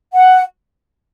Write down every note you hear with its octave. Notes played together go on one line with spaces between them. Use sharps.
F#5